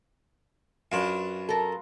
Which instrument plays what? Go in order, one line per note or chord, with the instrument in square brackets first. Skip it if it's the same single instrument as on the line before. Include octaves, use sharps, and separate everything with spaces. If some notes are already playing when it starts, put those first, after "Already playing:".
[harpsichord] F#2 D4 [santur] F4 B4
[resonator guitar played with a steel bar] A4 A#4